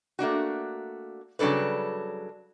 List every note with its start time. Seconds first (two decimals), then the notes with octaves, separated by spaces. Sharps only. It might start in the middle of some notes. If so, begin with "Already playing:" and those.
0.19 A3 A#3 D4 F#4
1.39 C#3 F#3 G3 D4 A4 B4